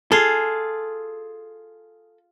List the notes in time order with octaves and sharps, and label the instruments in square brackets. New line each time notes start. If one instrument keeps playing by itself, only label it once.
[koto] F4 G#4 [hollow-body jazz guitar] A4